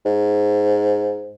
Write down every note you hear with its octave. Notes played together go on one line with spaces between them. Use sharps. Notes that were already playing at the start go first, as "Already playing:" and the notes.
G#2